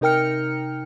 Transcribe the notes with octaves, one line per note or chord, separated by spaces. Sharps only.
C3 D#4 A#4 G5 F6 C#7